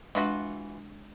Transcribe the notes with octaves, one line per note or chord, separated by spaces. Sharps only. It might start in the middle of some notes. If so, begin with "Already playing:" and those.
E3 G#3 D4 F4 F#4 E5